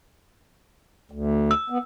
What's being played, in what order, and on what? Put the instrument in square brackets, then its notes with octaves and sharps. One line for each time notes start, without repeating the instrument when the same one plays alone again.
[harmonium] D2
[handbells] E6
[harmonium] B3